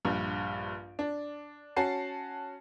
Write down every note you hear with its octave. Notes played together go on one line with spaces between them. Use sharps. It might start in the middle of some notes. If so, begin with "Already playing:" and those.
A#1 G2
D4
C#4 F#4 A5 C7